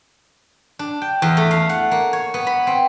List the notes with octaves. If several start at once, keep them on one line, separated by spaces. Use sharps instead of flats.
D4
G5
E2
A3
F5
F#5
A#3
C#5
B3
B5
C4